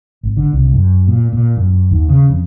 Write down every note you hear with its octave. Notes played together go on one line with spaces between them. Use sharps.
G#1
D3
C2
F#2
A#2
A#2
F#2
D#2
C#3
F2